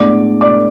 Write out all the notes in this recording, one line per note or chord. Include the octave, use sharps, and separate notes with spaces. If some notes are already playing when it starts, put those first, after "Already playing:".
Already playing: A2 G#3 B3 D4 D5 D6
D5 D6